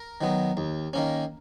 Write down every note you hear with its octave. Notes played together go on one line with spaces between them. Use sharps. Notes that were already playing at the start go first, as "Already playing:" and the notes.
Already playing: A#4
D#3 F#3 B3
D#2
D#3 A#3 C#4